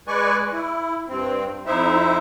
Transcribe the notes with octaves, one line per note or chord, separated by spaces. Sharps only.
G#3 B4 D5 G#5 C#6
E4
G2 C4
F2 D#4 E4 C5 E5